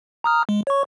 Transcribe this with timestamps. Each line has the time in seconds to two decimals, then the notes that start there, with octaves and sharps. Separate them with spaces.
0.24 A#5 D#6 F6
0.49 G#3
0.67 C#5 C#6